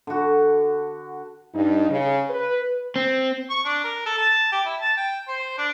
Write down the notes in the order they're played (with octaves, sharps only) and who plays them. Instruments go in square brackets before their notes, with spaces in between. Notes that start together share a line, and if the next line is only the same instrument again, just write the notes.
[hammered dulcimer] D3 F#4
[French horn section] G2 D#4
C#3
B4
[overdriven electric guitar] C4
[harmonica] C#6
D4
A#4
A4
A5
G4
E4
A5
G5
C5
D4